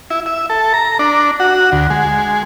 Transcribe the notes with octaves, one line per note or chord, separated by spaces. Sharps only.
E4
E5
A4
A#5
D4
F#4
D2
G#3